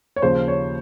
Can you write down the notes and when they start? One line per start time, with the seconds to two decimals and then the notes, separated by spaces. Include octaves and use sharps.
0.16 C#5
0.22 D#2 C#3 F3 C5
0.48 C#5